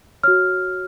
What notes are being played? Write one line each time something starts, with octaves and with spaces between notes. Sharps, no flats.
F#4 C#5 F6